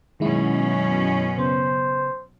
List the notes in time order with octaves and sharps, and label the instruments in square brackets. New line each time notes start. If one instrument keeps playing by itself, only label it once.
[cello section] F#2 B2 C#4 [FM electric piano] D#3 G#3 E4
[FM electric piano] C#3 B3 [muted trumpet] C5